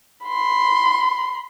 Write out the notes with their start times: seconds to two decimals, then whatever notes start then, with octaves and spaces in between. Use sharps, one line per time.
0.25 B5 C6